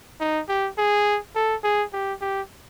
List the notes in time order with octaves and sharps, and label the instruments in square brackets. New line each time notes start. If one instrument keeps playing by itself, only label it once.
[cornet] D#4
G4
G#4
A4
G#4
G4
G4